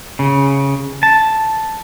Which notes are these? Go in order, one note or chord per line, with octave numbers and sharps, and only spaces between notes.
C#3
A5